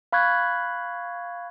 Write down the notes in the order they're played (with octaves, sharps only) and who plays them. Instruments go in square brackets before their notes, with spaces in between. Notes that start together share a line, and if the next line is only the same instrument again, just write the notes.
[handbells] F5 B5 C#6 F#6 G#6